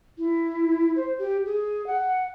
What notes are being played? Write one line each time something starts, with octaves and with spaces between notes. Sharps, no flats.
E4
C5
G4
G#4
F#5